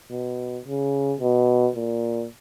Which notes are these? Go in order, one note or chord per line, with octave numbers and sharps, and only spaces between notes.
B2
C#3
B2
A#2